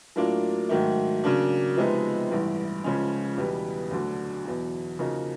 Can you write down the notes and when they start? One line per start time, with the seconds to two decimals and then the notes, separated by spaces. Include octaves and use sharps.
0.16 A2 F#3 A#3 D4 F4
0.69 G#2 D#3 F#3 A3
1.24 C#3 F#3 A#3 D4
1.77 C3 F3 G#3 B3 D#4
2.31 A1 G2 E3
2.84 C#2 C#3 F3 G#3 C#4
3.37 E2 B2 G3 B3
3.91 D2 D3 F#3
4.45 E2 B2 F#3
4.99 C#3 F3 A#3 D#4 F#4